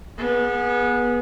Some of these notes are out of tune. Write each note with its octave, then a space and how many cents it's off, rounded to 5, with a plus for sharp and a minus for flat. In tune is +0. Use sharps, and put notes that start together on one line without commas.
B3 -25 G#4 +0